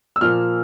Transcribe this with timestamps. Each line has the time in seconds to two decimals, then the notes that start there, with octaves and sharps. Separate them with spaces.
0.16 E6
0.21 A#2 F3 A#3 F6